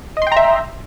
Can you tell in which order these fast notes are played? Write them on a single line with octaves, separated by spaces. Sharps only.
D#5 C6 G5 A#5 E5